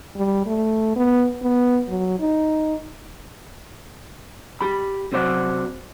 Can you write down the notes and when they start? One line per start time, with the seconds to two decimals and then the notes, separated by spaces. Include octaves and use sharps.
0.16 G3
0.46 A3
0.96 B3
1.42 B3
1.88 F#3
2.20 D#4
4.61 G4 B5
5.12 F#2 C3 F#3 C5 D5 F#5